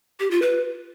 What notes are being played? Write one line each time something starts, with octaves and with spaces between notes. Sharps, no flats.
G4
F4
B4